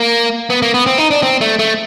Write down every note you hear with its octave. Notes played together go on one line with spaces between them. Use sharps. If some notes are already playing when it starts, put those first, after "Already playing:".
Already playing: A#3
B3
A#3
B3
C4
D#4
D4
C4
A3
A3